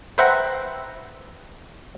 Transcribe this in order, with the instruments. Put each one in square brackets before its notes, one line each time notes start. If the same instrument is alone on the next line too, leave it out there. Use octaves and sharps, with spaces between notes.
[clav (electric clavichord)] B4 C5 E5 F#5 G5 A#5